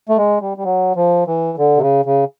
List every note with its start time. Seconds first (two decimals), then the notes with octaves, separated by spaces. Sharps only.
0.09 A3
0.18 G#3
0.41 G3
0.57 G3
0.65 F#3
0.96 F3
1.27 E3
1.58 D3
1.77 C3
1.82 C#3
2.05 C#3